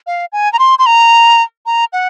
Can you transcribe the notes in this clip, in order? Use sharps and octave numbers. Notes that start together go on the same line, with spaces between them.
F5
G#5
A#5
C6
C6
A#5
A#5
F#5